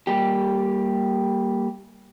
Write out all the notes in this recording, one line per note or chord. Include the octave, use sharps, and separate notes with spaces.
G3 A#3 G4